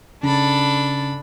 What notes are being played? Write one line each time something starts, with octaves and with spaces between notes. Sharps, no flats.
C#3 D4 A4 B5